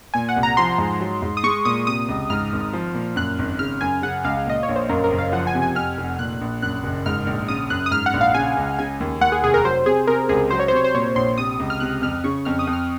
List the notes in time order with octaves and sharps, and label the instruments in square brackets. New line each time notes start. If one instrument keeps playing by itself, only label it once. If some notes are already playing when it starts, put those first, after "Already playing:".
[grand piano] A#2 [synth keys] G#5
[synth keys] F#5
[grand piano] C2
[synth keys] A#5
[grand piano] F3 [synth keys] C6
[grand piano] G#2
F#3
G#2
[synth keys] D#6
[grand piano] G#3 [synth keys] C#6
[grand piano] A#2 [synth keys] D#6
[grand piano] C3 [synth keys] D#6
[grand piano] C#2
[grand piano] G#2 [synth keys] F6
[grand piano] G#1
F3
A#2
[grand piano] F#2 [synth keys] F#6
[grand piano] G#1
[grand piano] C#3 [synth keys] F6
[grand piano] F#2 [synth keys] G#5
[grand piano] C#3 [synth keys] F#5
[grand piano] C#2 [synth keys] F5
[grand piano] A#2 [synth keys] D#5
[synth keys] C#5
[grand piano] A#1
[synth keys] C5
[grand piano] F#2 [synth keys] A#4
[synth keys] A#4
[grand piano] F#1
[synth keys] F5
[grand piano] F3 [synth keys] F#5
[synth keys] G#5
[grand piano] C3
[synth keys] G#5
[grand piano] F2 [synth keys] F6
[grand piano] F1
[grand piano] A#2 [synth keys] F#6
[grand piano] A#1
[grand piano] F#2 [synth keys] F#6
[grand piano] F#1
[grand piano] G#2 [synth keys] F6
[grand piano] A#1
[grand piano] C#3 [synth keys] D#6
[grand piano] F#2 [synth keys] F#6
[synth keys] D#6
[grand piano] G#2 [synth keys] F6
[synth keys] F#5
[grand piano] A#1
[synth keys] F5
[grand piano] C#3 [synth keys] G#5
[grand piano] C#2
[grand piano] C#3 [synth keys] G#5
[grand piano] D#2
[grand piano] D#2 [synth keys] F#5
[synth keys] G#4
[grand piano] F1 [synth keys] G#4
[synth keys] A#4
[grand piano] F#3 [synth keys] C5
[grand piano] C3 [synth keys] G#4
[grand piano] C3 [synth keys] A#4
[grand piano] C#2 [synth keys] G#4
[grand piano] F#3 [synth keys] C5
[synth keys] C#5
C5
[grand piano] C3 [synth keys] C#5
[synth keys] C5
[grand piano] A#2 [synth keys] C#5
[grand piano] A#1 [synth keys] C6
[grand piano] C3 [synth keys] D#6
[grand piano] C#2
[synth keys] F6
[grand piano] C3 [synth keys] F#6
[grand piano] F2 [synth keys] F6
[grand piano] C#3 [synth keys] C#6
[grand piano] F2 [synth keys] F6
[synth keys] D#6
[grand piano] F2
[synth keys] F6